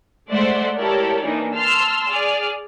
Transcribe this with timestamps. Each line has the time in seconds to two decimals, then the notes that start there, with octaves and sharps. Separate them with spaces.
0.30 G#3 A3 C5 D5 E5 F#5
0.76 E4 G4 A4 A#4 C#5 D5
1.24 E3 A#3 D4 D#4
1.55 A5 C6 E6 F6
2.09 G#4 D5 F6